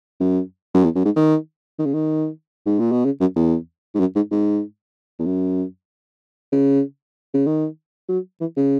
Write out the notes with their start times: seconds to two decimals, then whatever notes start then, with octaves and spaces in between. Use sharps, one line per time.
0.20 F#2
0.74 F#2
0.84 E2
0.95 F#2
1.05 G#2
1.16 D#3
1.79 D#3
1.85 C#3
1.94 D#3
2.66 G#2
2.79 A#2
2.92 B2
3.05 C#3
3.20 F#2
3.36 E2
3.95 G#2
4.00 F#2
4.16 G#2
4.31 G#2
5.19 E2
5.25 F#2
6.52 C#3
7.34 C#3
7.47 D#3
8.09 F#3
8.41 E3
8.57 C#3